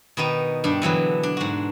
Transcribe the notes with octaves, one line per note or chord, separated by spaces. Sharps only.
B2 D#3 B3 D#4
G2 D4
D3 E3 F#3 B3
D4
G#2 F#4